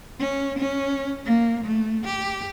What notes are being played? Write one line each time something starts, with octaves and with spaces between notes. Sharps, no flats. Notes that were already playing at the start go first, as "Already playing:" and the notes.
C#4
C#4
A#3
A3
G4